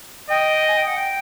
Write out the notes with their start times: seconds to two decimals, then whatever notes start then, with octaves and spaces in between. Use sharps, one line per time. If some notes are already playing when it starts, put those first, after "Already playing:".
0.30 D#5 G5
0.68 G#5
0.77 G5
0.87 F#5
0.97 G5